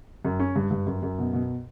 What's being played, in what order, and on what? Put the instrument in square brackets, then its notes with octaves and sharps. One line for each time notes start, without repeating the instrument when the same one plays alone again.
[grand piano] F#2
C#4
G2
G2
F#2
F#2
B2
B2